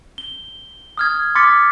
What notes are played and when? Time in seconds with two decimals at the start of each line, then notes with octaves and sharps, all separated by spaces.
0.18 G7
0.97 D#6 F6 G#6
1.35 C6 D6 F6 A6 B6 C#7